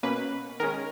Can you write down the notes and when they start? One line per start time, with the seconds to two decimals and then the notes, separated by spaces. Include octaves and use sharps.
0.03 B2 A#3 C#4 B4
0.60 D#3 G#3 C#4 A#4